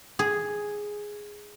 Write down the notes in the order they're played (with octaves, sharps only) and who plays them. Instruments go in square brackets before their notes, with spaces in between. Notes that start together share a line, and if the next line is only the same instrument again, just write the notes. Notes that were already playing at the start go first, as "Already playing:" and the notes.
[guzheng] G#4